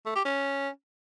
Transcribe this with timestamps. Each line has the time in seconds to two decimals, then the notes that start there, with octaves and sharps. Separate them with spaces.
0.06 A3
0.15 G4
0.25 C#4